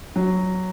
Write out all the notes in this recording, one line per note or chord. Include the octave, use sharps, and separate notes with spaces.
F#3